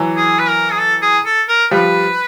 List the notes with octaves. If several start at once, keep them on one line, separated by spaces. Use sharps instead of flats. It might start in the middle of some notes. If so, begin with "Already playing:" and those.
Already playing: E3 F#3
G#4
B4
A#4
G#4
A4
G#4
A4
A#4
F3 G3 B4